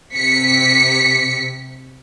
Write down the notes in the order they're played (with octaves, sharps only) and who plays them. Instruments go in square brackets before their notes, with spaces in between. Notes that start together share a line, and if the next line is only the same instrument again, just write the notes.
[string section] C3 B6 C#7